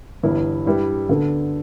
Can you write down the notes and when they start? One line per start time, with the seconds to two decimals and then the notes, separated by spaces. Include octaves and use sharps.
0.23 G1 G2 E3 B3 E4
0.66 G2 G3 E4 B4
1.09 D2 D3 B3 D4 A4